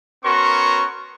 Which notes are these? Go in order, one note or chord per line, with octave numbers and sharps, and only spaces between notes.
B3 C#4 F#4 A#4 C6 C#6